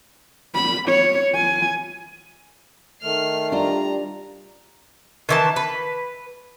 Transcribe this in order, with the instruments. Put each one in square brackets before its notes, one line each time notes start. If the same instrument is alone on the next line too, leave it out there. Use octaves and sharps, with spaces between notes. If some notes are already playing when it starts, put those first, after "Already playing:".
[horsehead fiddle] B5
C#5
G#5
[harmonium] D#3 A3 [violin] F6 C7
[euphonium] G3 [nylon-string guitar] D4 F4 [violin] A#5
[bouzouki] D#3 E3 A5
B4